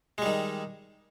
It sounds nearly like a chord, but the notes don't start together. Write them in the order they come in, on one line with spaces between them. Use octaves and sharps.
G#3 G3 D#3